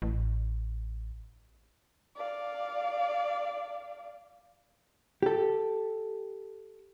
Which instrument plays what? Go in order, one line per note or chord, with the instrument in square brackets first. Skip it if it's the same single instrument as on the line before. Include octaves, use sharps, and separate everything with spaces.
[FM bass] A1
[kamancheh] D5 F5
[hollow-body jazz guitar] G4 A4